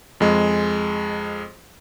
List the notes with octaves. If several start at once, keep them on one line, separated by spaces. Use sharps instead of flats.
F2 G#3